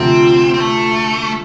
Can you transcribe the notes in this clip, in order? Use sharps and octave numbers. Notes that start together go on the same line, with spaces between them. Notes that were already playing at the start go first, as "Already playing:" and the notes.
Already playing: D2 C3 F3 C4
C4
A3